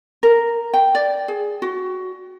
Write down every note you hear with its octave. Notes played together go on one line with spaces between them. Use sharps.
A#4
G5
D5
G#4
F#4